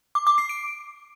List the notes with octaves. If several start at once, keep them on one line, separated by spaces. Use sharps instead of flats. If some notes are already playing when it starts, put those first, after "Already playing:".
D6
D6
C7
D7